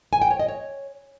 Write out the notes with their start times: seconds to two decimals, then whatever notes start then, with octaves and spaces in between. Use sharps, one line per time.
0.13 G#5
0.22 G5
0.31 C#5
0.40 D#5
0.48 C#5